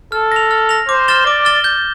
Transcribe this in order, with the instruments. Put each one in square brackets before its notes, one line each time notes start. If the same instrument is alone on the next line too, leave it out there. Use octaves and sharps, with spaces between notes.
[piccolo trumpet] A4 [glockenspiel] F6
[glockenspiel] A#6 F7
F6
A#6 F7
[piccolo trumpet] C5 [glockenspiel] D6
[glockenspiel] F6 A6 E7 G7
[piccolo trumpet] D5 [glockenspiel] D6
[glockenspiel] F6 A6 E7 G7
G6